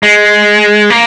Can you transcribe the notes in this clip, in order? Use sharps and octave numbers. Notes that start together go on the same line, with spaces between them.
G#3
A#3